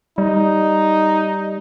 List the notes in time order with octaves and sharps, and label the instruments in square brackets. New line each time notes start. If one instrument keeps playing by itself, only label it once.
[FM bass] G3 [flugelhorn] D#4